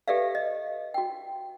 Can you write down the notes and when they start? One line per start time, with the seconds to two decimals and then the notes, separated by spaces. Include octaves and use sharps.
0.08 G4 A4 B4 D5 E5 F5
0.35 D#5
0.94 F#4 G5